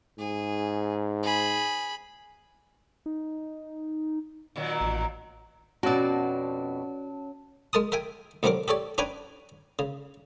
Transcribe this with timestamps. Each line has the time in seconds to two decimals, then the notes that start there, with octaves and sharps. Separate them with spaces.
0.18 G#2 G#4
1.23 G#4 B5
3.06 D#4
4.56 A#2 D#3 F#3
4.81 A1
5.83 F2 B2 C#4 F#4 C#5 D5 A5
7.73 G#3 A#4 A5 D#6
7.92 A#4 E5 G5 G#5
8.43 D2 C3 F#3 D4 A#4 D6
8.68 G4 A4 C#5 D5
8.98 C#4 D4 B4 G5 G#5 A#5
9.79 C#3